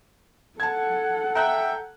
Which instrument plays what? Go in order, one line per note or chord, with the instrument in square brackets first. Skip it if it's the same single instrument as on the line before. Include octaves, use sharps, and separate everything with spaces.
[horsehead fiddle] A4 F#5 [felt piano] A5 G#6
[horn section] E5 G5 [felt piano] A#5 F#6